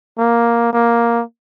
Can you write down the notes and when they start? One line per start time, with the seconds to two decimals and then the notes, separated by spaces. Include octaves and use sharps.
0.18 A#3
0.73 A#3